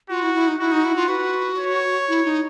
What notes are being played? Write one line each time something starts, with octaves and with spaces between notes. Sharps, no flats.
F4 F#4
E4
E4
D#4
E4 F#4
D#4
E4
F4
F#4 B4
C#5
E4
D#4